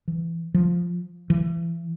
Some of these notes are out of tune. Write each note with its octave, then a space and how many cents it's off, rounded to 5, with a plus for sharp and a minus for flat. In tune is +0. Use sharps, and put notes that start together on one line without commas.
E3 +20
F3 +0
E3 +35